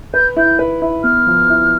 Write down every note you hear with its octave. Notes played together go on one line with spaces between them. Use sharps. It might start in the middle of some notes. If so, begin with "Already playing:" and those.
B4 G6
E4 G6
B4
E4
B3 F6
F3
E4